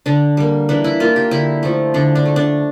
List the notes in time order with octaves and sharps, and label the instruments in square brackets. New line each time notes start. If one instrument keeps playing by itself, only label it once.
[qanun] D3 D4
G3 A#3
E3 D4
E4
A#3 F4
G4
D3 E4
F3 A3
D3 D4
D4
A3
D4